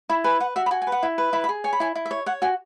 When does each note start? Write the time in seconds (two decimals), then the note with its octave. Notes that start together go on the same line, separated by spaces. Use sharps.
0.09 E4 B5
0.24 B4 G#5
0.40 B4 F#5
0.56 F#4 E5
0.66 B5
0.71 F#4 G#5
0.82 G#5
0.87 B4
0.92 F#5
1.03 E4
1.18 B4
1.33 E4 B5
1.44 B5
1.49 G#4
1.64 C#5 G#5
1.73 B5
1.80 E4 G#5
1.95 E4
2.05 E5
2.11 C#5
2.26 C#5 F#5
2.42 F#4 G#5